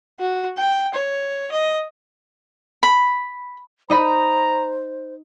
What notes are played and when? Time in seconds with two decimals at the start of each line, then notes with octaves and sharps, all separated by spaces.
0.20 F#4
0.58 G5
0.95 C#5
1.52 D#5
2.83 B5
3.90 D#4 C5 D#5 A#5 B5